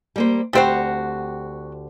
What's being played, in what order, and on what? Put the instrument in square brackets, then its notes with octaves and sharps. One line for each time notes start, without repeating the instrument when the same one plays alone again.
[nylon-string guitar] G3 A#3 C5
[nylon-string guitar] D2 G4 C5 [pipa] G3 C4 F#4